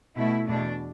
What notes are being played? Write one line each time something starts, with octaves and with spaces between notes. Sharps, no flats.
B2 A3 E4
E2 B2 A3 D4